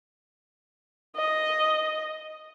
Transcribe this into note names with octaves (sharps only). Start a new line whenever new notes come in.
D#5